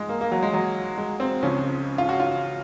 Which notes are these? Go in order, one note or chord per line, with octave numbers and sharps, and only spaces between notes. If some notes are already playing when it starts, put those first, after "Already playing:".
Already playing: G#2 F3 G#3
A#3
A#3
F#3
G#3
F#3
G#3
C4
C#2 C#3 F3 C#4
F4
F#4
F4